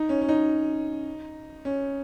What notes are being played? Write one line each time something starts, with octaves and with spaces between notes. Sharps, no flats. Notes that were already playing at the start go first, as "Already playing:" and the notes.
Already playing: D#4
C#4
C#4
D#4
C#4